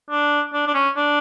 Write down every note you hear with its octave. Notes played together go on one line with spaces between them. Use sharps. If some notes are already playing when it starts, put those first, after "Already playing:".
D4
D4
D4
C#4
D4